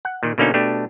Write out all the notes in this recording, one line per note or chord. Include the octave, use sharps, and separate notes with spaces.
F#5
A#2 D#3
B2 D3 A#3 C#4 D#4
B2 A3 D4 G4